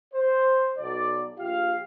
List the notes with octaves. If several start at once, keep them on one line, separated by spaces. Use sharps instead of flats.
C5
B1 D5
A#1 F4 G4 F5